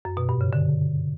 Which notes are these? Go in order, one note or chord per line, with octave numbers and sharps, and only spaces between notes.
F#2
B2
G2
C#3
D3